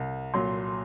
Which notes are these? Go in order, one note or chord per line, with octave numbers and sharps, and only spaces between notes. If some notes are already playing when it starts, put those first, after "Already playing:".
Already playing: C2
A#2 F#3 C6